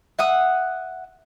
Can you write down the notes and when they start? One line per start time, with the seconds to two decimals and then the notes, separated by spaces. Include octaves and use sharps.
0.19 E5 F#5 D#6